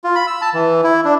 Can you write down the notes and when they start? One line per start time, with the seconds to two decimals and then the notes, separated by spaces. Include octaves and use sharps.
0.04 F4
0.16 B5
0.27 E6
0.41 A5
0.54 E3
0.84 E4
1.05 D4